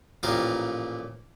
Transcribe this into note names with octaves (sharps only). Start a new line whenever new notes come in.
A1 A#2 F3 A#3 G4 F5